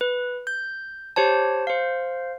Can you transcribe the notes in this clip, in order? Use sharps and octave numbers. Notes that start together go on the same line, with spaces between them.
B4
G6
G4 C5 C#5 A5
C5 F5